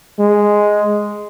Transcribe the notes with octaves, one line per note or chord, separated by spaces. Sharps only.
G#3